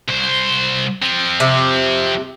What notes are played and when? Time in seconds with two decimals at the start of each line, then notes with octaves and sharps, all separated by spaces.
0.08 C2 C5
1.02 F3 C4
1.40 C3